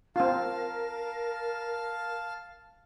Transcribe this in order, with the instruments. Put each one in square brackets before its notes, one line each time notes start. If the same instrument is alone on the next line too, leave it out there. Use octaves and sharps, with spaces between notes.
[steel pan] C4 F4 [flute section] A#4 [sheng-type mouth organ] F5 A5